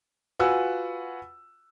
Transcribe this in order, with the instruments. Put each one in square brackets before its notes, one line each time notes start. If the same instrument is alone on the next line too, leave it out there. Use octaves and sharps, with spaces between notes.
[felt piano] F4 F#4 B4 F#5 G#5 E6